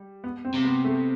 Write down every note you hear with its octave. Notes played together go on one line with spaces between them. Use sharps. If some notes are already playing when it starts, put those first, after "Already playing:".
Already playing: G3
B3
C4
C3
B3
A3